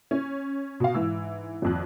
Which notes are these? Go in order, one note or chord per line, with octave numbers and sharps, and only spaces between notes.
C#4
B2 F5
G#2 E3 E6
G#1 F2 F#6